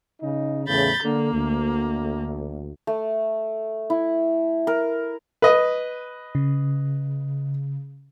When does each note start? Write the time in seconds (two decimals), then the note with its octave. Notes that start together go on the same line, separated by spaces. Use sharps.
0.21 C#3 D#4
0.67 E2 A2 C#3 B5 G6 A6
1.03 D3 A#3
1.32 D2
2.87 A3
3.90 E4
4.67 A#4
5.42 B4 D#5
6.35 C#3